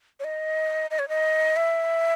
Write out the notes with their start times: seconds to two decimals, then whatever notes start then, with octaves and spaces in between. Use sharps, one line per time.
0.20 C#5
0.24 D#5
0.90 D#5
0.99 C#5
1.08 D#5
1.56 E5